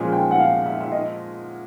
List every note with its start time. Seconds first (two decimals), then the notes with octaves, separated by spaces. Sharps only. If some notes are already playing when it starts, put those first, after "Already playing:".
Already playing: A#2 F3 G#3 C#4 F4 G#5
0.13 G5
0.31 F#5
0.39 F5
0.66 E5
0.80 E5
0.92 D#5